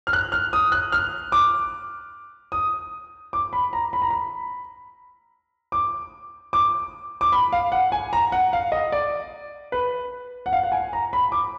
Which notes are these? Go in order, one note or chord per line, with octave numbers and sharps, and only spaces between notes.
F6
F#6
F6
D#6
F#6
F6
D6
D#6
D6
B5
A#5
B5
A#5
B5
D6
D6
D6
B5
F5
F#5
G#5
A#5
F#5
F5
D#5
D5
B4
F#5
F5
F#5
G#5
A#5
B5
D6